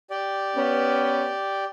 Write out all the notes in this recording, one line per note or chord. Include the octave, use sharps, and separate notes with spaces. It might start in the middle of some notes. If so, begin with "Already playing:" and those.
G4 D5
B3 C#4